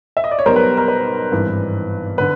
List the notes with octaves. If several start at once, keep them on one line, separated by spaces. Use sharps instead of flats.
E5
D#5
D5
C#5
B1 B2 G3 A#4 C5
B4
A#4
B4
G#1 G2 E3
D3 B4